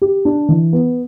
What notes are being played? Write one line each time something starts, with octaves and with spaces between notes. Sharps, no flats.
G4
D4
E3
B3